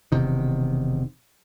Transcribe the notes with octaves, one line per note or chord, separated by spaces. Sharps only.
E1 E2 C3 D#3